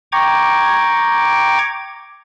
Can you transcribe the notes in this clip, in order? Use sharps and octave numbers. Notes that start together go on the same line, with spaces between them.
G5 A#5 C#6 D6 G#6